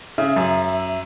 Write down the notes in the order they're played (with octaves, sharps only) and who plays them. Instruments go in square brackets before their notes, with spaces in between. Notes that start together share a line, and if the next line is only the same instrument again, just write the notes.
[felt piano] C#3 [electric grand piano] E5
[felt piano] F#2